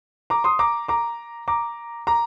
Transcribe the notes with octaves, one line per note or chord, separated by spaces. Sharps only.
A#5 D6
C6 D#6
A#5 D6
A#5 D6
A#5 D6
A#5 D6